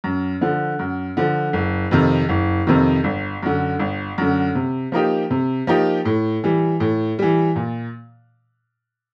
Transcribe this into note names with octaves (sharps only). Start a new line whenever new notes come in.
F#2
D3 F3
F#2
D3 F3
F#1
F2 C3 D#3
F#1
F2 C3 D#3
G1
F#2 D3
G1
F#2 D3
C3
F3 A#3 D#4 G4
C3
F3 A#3 D#4 G4
A2
E3 G3
A2
E3 G3
A#2